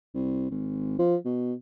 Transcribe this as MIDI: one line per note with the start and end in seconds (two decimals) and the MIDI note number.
0.14 0.47 36
0.50 0.98 32
0.99 1.16 53
1.25 1.53 47